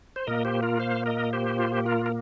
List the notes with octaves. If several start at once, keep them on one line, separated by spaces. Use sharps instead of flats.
C5
A#2 A#3 A#4 D#5
G4 C5
F4 A#4
C5 F5
A#4 D#5
G4 C5
F4
G4
F4 A#4
A#4